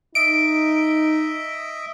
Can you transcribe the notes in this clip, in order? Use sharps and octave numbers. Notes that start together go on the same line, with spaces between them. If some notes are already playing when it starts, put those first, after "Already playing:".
D#4 D#5 E5 D7